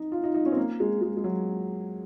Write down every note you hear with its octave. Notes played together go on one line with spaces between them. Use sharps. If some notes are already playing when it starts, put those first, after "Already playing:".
Already playing: D#4
F4
D#4
D#4
C#4
C4
A#3
G#3
G#3
G#3
F#3